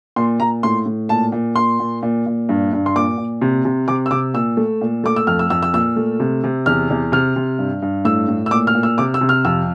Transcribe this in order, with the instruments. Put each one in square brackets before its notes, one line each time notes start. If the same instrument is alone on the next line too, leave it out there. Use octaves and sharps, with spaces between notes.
[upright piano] A#2 C6
A#2 A#5
A2 C6
A2
A#2 A5
A#2
A#2 C6
A#2
A#2
A#2
G2
G2
C6
A#2 D6
A#2
C3
C3
C3 D6
E6
C3 D6
A#2 E6
A3
A#2
A3 D6
E6
F2 F6
E6
F2 E6
E6
A#2 E6
A3
C3
C3
E2 F6
E2
C3 F6
C3
G2
G2
A2 E6
A2
E6
A#2 D6
F6
A#2
E6
C3 D6
E6
C3
F6
F2 E6